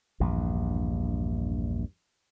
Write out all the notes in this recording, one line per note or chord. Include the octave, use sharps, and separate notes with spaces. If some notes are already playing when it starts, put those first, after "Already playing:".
A#1 E2 G2